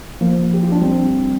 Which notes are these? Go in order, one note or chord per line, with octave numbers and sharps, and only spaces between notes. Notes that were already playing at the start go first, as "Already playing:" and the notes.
F3 A#3
G4
F4
D4
G3 C4